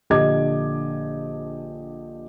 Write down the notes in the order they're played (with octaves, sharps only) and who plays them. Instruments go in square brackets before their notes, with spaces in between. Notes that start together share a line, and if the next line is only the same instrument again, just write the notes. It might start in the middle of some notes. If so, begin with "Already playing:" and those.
[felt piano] A#1 D3 G4 D#5 D6 G#6